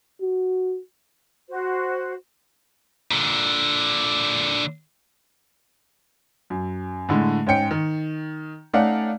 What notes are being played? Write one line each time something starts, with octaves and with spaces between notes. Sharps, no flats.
F#4
F#4 C5
A#2 D3
F#2
A2 D3 G#3
G#2 C#4 G5 C#7
D#3
A3 C#4 D#4 D5 F5 F#5